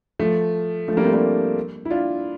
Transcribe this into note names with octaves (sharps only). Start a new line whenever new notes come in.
F3 A3
F3 A3
G3 A#3
A3 C4
A#3 D4
E4
D4 F4